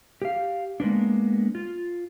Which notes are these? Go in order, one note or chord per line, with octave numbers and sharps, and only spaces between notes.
G4 F5
G#3 A#3 B3 D4
F4